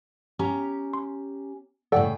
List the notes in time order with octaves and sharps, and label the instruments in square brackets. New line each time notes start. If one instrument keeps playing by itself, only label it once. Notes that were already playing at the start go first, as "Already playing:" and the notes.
[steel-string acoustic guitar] C#4 G4 A#5
[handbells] C6
[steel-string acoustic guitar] A2 C#3 G5 [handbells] A4 D5 F#5